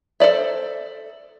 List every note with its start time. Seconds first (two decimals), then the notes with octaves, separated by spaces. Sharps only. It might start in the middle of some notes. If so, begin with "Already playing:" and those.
0.20 A4 C5 D5 E5